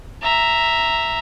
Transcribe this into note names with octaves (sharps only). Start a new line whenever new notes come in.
E5 A#5